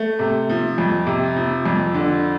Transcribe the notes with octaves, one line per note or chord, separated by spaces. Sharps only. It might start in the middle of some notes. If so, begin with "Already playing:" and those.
Already playing: A3
C3
F3
F2
C3
F3
F2
D3